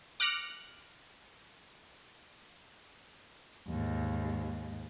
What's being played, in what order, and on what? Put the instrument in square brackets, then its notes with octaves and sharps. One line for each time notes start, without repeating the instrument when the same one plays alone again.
[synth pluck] D6 F6 F#6 A#6 C#7 D7
[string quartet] D#2 G#2